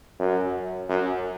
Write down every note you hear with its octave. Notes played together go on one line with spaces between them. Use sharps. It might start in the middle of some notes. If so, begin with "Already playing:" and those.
F#2
F#2